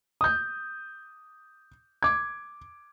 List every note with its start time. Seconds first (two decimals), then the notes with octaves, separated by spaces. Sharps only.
0.21 D#6 G6
2.03 D6 G#6